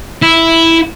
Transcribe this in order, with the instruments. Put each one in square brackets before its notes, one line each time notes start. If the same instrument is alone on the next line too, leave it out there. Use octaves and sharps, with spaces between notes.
[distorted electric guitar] E4